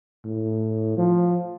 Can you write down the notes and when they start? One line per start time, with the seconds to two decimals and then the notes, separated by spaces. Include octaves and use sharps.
0.25 A2
0.97 F3